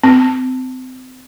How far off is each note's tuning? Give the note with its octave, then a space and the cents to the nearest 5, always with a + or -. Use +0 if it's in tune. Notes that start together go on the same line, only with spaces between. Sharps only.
C4 -30